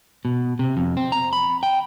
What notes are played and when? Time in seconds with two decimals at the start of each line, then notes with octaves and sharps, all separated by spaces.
0.25 B2
0.59 C3
0.77 F2
0.97 C4
1.12 A#5
1.33 B5
1.63 G5